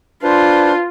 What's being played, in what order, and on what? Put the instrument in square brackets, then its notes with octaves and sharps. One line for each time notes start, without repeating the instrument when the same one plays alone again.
[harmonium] D4 B4 C5 [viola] F4